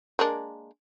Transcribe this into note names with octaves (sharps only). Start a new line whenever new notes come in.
G#3 A#3 D4